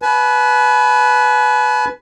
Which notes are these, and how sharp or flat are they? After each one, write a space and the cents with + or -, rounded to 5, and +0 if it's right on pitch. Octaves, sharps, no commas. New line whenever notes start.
B4 +0 G#5 +45